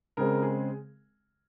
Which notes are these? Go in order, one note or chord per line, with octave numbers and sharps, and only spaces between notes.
C#3 G#3 C4 A#4
G#4